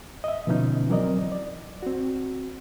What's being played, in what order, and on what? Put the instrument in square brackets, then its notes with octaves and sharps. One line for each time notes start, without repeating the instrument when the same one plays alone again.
[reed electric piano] D#5 E5
B2 D3 F3 B3 C#4 D#4
E3 F#3 C4 A#4 D5 D#5
D5
C4 F#4